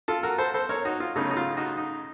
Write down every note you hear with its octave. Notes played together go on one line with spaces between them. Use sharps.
F4 A4
F#4 A#4
A4 C5
A4 C5
A#4 C#5
D#4 F#4
F4
F#2 C#3 A3 C#4 D#4
D#4
F4
D#4 F#4
D#4